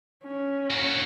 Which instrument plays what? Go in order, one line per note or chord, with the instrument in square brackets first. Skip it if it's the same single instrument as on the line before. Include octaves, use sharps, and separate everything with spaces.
[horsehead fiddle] C#4
[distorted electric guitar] A#3 F#4